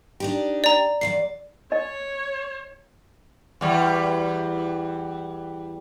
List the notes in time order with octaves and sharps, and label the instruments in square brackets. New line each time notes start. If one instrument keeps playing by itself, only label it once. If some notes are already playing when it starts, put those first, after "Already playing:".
[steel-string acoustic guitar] D4 D#4 G4
[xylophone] D5 A#5
[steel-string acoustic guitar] E2 C#3 D5 [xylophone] C7
[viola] C#5 [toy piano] D#5
[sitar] E2 G3